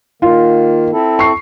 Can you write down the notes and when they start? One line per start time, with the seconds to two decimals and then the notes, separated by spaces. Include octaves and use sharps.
0.22 D#3 A#3 F4
0.93 C4 E4 A4
1.19 C#6 C7